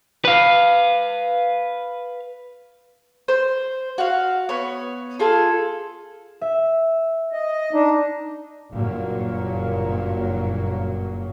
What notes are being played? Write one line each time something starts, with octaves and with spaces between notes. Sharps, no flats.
B4 F5
C5
F#4 F5
B3 C#5
F4 G#4 A4
E5
D#5
D4 D#4
F#1 G2 A#2 F#3 A#3